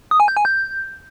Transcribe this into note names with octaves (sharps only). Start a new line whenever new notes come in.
D#6
G#5
G6
G#5
G6